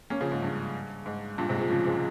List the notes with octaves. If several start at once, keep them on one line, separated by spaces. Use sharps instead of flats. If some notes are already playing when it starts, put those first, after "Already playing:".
A#3 C#4
C#3 F3
G#2
G2
G#2
G2 A#2
G#2 C3
F3 G#3
C#3 F3
F3 G#3